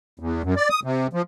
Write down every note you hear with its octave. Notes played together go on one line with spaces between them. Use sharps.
E2
F#2
D5
D#6
C3
F3